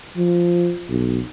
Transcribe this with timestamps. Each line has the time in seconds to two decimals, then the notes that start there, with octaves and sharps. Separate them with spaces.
0.17 F3
0.89 B1